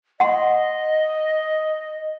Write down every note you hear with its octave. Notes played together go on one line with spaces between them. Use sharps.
D#5 F#5 C6